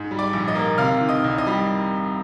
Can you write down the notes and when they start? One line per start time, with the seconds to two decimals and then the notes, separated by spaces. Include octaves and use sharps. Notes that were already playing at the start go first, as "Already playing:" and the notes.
Already playing: G#2
0.11 G3
0.18 D5 D6
0.33 A#1
0.48 D#5 D#6
0.55 A#3
0.78 C3 F5 F6
1.01 D#3
1.08 D#5 D#6
1.24 C2
1.38 D#5 D#6
1.47 G3